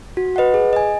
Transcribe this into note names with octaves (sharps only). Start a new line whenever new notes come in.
F#4
B4 D#5 F#5
G#4
D#5 G#5